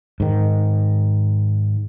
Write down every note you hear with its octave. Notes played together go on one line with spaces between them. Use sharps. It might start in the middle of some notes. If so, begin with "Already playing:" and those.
G#2 D#3